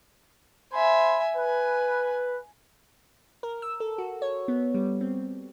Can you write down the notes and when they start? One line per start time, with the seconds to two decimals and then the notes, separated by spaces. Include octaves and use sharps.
0.73 C5 E5 G#5 B5
1.36 B4 G#5
3.43 A#4
3.62 E6
3.80 A4
3.98 F#4
4.22 C#5
4.48 B3
4.74 G3
5.01 C4